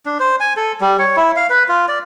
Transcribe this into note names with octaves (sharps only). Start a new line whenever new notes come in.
D4
C5
G#5
A4
G3
C#5
E4
F5
B4
F4
D5